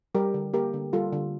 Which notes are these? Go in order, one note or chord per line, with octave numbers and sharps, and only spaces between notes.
G3 G4 A#4
D3
A#3 G4 A#4
D3
G3 F4 A4
D3